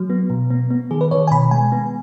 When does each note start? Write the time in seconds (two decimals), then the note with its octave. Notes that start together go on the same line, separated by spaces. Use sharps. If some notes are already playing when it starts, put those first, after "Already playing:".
Already playing: F#3
0.10 B3
0.30 B2
0.50 B3
0.71 B3
0.91 D#3 G#4
1.01 B4
1.11 D#3 C#5
1.27 G#5
1.31 B2 B5
1.51 G#3 G#5
1.72 B3